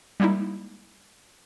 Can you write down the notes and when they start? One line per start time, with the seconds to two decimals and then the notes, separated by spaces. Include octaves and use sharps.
0.20 G3 G#3 A#3 D#4 E4